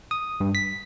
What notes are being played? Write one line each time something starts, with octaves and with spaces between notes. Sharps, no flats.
D#6
G2
B6